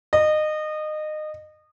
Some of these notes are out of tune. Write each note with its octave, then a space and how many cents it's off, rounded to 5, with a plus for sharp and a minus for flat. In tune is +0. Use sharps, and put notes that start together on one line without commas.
D#5 -25